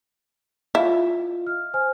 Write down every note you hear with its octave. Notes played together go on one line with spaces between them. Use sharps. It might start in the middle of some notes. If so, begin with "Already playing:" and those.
E4 F4 D#5 F5
F6
C5 G#5 F6